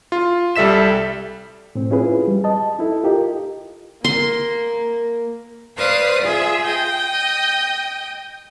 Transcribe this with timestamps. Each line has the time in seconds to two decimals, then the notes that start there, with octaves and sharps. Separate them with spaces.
0.12 F4
0.56 C2 G3 A4 E5 B6 E7
1.75 A2 C4
1.91 C#4 E4 F4 G#4 B4
2.28 G3
2.44 D#5 A5
2.79 D#4 E4 A4
3.04 F4 G4 A#4 D#5
4.04 A#3 C6
5.77 B4 C5 D5 F5 D#6 F#6
6.22 F4 G#4 E5
6.65 D#5 G5